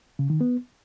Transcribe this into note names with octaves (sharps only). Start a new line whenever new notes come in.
C#3
D#3
B3